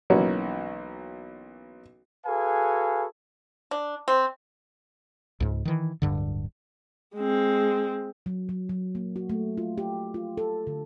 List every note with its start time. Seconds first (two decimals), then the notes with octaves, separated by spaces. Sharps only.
0.10 B1 E3 A#3 C#4 F#4
2.26 F#4 G#4 A4 B4 F5 G#5
3.71 D4
4.08 C4
5.40 C#2 G#2
5.65 D#3 E3
6.02 D1 G2 D3
7.16 G#3 C4
8.26 F#3
8.49 F#3
8.69 F#3
8.95 A#3
9.16 F#4
9.30 A3
9.58 F4
9.78 G4
10.14 F4
10.37 A4
10.67 D3